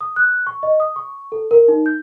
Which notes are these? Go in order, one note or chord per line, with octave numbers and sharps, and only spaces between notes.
D#6
F#6
C#6
D#5
D#6
C#6
A4
A#4
D#4
G6